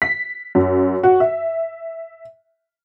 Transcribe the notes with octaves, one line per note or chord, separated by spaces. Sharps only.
B6
F#2
F#4
E5